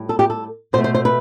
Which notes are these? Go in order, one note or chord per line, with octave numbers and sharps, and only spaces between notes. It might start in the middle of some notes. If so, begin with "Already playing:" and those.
Already playing: A2 G3
A4
G4
A4
B2 A3 C5
C5
C5
B4